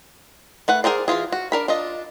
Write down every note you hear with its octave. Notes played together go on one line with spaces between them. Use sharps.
A3 B4 F#5
G#4 A#4 C5 D5
E3 F3 F4 G#4
F#4
D4 A#4 B5
D4 F4 D#5